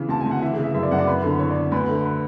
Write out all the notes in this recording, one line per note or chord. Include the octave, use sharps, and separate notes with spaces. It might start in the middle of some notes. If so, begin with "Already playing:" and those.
Already playing: C#3 E3
D2 A5
G#5
D2
F#5
E3 E5
G#4
C#3 E5
F#2 E5
D5
F#2 F#5
D5
E2 B4
D3 A4
E2 C#5
D3 D5
D2 B4
D3 A4
B4